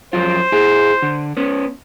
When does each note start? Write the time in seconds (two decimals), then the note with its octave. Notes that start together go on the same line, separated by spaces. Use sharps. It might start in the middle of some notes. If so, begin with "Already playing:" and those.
0.13 F2 F#3 F4 C5
0.52 E4 G#4
1.02 D3
1.37 B3 C#4